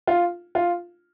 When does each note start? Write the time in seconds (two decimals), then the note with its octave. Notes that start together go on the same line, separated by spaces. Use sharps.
0.07 F4
0.55 F4